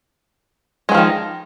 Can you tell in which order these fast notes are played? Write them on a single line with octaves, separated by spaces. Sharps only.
G#3 F#3 F3 D#3